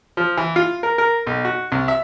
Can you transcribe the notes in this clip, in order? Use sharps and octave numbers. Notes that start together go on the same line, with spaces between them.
F3
E3
F4
A#4
A#4
B1
F#4
C2
E5